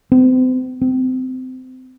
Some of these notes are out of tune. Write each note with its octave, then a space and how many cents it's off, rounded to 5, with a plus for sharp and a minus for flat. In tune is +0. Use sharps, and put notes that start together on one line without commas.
C4 -40
C4 -25